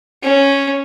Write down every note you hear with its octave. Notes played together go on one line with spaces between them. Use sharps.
C#4